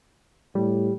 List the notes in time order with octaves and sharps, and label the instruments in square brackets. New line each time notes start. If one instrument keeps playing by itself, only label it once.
[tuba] A2 [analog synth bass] G3